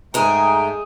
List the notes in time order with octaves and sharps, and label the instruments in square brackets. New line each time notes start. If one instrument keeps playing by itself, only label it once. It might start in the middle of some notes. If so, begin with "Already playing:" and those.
[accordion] G#2 A3 G5 [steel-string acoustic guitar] G#3 G#4 [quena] A#5